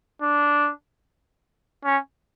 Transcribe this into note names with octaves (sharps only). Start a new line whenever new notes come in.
D4
C#4